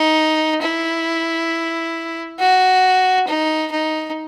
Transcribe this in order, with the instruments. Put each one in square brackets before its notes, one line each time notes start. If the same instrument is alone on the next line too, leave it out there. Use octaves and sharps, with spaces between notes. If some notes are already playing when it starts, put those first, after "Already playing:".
Already playing: [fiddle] D#4
E4
F#4
D#4
D#4